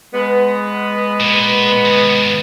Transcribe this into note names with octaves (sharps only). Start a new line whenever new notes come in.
G#3 B3
A#2
D#2 G#2